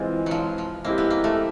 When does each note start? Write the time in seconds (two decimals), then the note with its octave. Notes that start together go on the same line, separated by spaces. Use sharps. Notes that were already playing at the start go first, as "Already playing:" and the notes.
Already playing: E3 G#3 C4 F4 G#4
0.26 F3 F#3
0.58 F3
0.84 G#3 A#3 C4 E4 G4
0.98 B3
1.10 A#3
1.24 A3